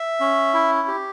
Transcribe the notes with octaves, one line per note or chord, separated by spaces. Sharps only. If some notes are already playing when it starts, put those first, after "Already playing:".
Already playing: E5
C#4
E4
G4